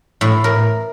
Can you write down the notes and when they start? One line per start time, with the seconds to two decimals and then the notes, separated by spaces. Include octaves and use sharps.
0.21 A2
0.44 A#4